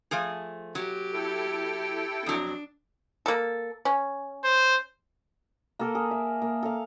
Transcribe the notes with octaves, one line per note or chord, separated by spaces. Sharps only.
F3 A3 G#4
F#3 G4
E4 A4 G5
F2 F#3 D4
A#3 A4
C#4
C5
A#3 A4 A#4
G#4
E5
A#3
A4 F5